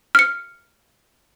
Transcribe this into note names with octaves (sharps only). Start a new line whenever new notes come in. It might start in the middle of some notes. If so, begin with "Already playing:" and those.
F6 C#7